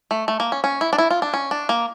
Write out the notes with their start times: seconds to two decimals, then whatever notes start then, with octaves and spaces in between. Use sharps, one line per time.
0.11 A3
0.28 A3
0.40 A#3
0.52 C#4
0.64 C#4
0.81 E4
0.93 D4
0.98 E4
1.10 F4
1.22 D4
1.34 C#4
1.51 D4
1.69 A#3